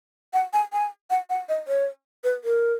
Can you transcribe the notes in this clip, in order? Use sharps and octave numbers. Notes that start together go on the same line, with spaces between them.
F#5
G#5
G#5
F#5
F#5
D#5
C#5
B4
A#4